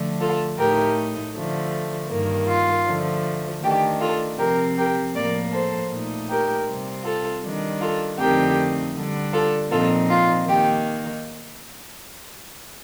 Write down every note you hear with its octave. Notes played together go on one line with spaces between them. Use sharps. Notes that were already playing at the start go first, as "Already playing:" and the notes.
Already playing: D3 F3 A3
F4 A4
A2 A3 D#4 G4 A#4
D3 F3 A3
G2 D#3 A#3
F4
D3 F3 A3
D#3 A3 D4 G4
F4 A4
C3 F3 C4 G4 A#4
G4 A#4
A2 F3 A#3 A#4 D5
A4 C5
A#2 A3 D#4
G4 A#4
C3 G3 C4
F4 A4
D#3 G3 D4
F4 A4
F2 D3 A3 C4 D#4 G4 A#4
D3 G3 D4
F4 A4
A#2 F3 C4 D#4 F4 A4
F4
D#3 A#3 D#4 G4